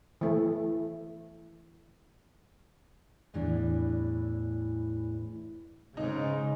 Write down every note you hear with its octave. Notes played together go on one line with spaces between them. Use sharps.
E3 A3
E2 A2 E3 D4
G#2 C#3 D#4